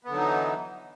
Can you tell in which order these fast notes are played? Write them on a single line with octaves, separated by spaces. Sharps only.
B3 D3 F#3 D#4 E3